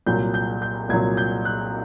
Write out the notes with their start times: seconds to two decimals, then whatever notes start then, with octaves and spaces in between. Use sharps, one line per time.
0.06 C2 A#2 F#3 G6
0.34 G6
0.62 G6
0.89 C2 A#2 F#3 G#6
1.17 G6
1.45 F#6